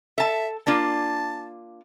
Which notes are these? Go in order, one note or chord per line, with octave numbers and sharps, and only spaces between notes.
A4 E5 A5
A#3 D4 F4 A5